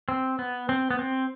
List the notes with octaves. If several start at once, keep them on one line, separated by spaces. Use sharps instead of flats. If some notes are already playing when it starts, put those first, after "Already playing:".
C4
B3
C4
B3
C4